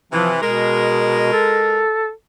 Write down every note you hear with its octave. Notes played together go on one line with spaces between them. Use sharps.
C3 E3 F3
B2 G#3 A#4
A4